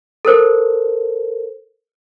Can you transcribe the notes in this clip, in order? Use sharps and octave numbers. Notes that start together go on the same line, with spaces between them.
A4 A#4 C5